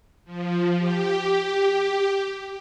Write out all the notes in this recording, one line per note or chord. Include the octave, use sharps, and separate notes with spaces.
F3
G4